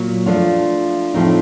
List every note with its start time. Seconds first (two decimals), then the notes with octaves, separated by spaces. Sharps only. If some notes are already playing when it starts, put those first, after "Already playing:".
Already playing: A#2 F#3 A#3
0.26 F3 A3 D4 F4
1.14 A2 F3 A3 C4 D#4